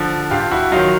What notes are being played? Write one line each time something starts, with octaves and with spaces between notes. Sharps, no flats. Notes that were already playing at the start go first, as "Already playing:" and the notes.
Already playing: D3 F3
G2 F4 G4
E4 F#4
D#3 F#3 D#4 F4